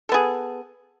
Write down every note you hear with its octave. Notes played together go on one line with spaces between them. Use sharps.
B3 G#4 A4